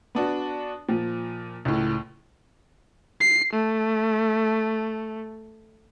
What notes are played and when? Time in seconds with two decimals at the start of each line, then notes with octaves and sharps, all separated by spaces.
0.15 B3 D4 F#4
0.89 A#2 F3
1.65 C#2 A2
3.20 C7
3.53 A3